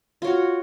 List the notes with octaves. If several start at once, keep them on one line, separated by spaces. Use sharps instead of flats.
F4 F#4 C#5